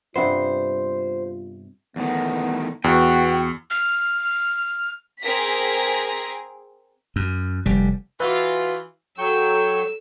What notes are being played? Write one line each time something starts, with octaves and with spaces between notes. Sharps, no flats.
G2 C3 B3 F4 C5
E2 A2 D#3 B3
E2 B3 F#4 G5
F6
C4 G#4 A#4 A#6 B6
F#2
F1 G3
E3 F4 F#4 B4
F#3 A4 G5 C#6 E6 G6